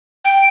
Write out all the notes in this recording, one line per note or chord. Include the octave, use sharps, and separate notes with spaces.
G5